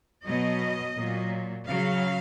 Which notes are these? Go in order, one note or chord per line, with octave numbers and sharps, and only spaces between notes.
B2 F#3 D#5
A#2 F#3
C#3 F#3 F5